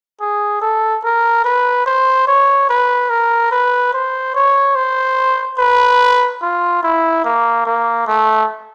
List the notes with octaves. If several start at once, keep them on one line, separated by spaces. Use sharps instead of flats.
G#4
A4
A#4
B4
C5
C#5
B4
A#4
B4
C5
C#5
C5
B4
F4
E4
A#3
A#3
A3